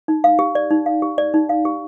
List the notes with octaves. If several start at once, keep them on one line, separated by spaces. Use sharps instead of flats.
D#4
F5
G4
D5
D#4
F5
G4
D5
D#4
F5
G4